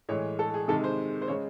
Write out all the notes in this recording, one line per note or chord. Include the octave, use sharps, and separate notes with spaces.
A2 E3 G#3 C#5
A4
G#4
C3 D#3 G#3 A4
C5
C5
C#3 G#3 C#5